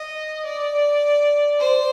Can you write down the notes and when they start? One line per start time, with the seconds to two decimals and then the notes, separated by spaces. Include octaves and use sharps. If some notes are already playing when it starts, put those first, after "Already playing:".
Already playing: D#5
0.45 D5
1.59 C5